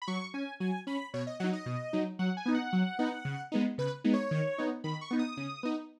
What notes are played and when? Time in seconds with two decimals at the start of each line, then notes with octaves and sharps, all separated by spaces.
0.02 B5
0.08 F#3 C#6
0.34 C#4 G#5
0.60 F#3 G#5
0.87 C#4 B5
1.14 B2 C#5
1.27 D#5
1.40 F#3 D#4 F#5
1.53 D#5
1.66 B2
1.93 F#3 D#4
2.19 F#3 F#5
2.37 G#5
2.46 B3 D#4
2.54 F#5
2.73 F#3
2.99 B3 D#4
3.25 C#3
3.52 G#3 B3 D#4
3.78 C#3 B4
4.04 G#3 B3 D#4
4.14 C#5
4.31 D#3
4.58 B3 D#4
4.84 D#3 B5
5.01 C#6
5.11 B3 D#4
5.19 D#6
5.37 C#3
5.63 B3 D#4